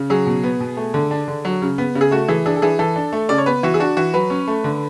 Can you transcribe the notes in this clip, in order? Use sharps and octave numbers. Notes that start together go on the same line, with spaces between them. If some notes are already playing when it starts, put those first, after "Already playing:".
Already playing: C#3
F#3 G#4
B2
B3
B2
A3
D3
D4
D3
F#3
C#3
B3
C#3
G#4
A3 F#4
E3 G#4
D4 G#4
A4
E3 G#4
E3 A4
D4
A3
C#3 D5
C#5
B3 B4
E3 F#4
G#4
D4 F#4
E3 F#4
F#3 B4
C#4
A3
D3